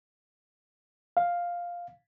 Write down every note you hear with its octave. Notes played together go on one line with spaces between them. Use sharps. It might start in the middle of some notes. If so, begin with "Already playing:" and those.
F5